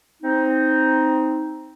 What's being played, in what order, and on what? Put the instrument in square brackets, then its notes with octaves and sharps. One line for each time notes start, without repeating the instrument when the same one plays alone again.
[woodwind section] C4 D#4